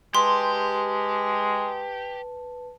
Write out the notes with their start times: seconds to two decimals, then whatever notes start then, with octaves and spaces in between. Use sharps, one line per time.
0.15 G#3 G4 B4 A5 C6